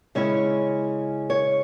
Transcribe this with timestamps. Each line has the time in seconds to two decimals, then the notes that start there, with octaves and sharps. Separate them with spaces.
0.15 C#3 G#3 C#4 E4 C#5
1.30 C#5